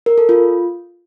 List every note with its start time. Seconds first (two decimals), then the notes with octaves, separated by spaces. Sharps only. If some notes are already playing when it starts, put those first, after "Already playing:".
0.06 A#4
0.18 A4
0.29 F4